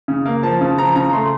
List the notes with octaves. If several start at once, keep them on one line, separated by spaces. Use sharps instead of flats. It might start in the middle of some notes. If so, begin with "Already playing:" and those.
C#3
A#3
F3 A5
C#3
F3 A#5
C#3 A#5
A3 C6